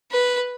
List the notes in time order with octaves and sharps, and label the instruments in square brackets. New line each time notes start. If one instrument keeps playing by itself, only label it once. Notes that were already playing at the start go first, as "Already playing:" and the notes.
[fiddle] B4